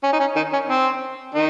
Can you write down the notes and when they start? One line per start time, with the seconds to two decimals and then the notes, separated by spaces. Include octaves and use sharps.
0.03 C#4
0.13 D#4
0.19 C#4
0.35 D#3 D#4
0.53 C#4
0.68 C4
1.34 D#3 D#4